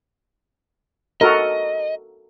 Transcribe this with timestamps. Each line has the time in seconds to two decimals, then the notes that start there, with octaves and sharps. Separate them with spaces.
1.21 F#4 A4 A#4 D#5